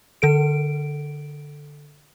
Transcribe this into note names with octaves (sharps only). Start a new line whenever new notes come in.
D3 A4 D7